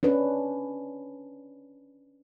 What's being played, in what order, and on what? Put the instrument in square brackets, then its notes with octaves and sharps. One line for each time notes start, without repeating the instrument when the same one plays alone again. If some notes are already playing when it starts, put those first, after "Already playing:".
[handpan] C#4 D4 B4